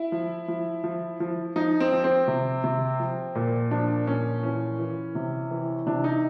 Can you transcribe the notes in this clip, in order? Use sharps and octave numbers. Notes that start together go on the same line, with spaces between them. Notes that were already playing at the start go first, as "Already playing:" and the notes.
Already playing: E4
F3
F3
F3
F3
F3 D#4
C4
F3
C4
C3
C3
F3
A#2
F3 D4
A#2 C#4
E3 C#4
E3
C3
E3
C3 D4
D#4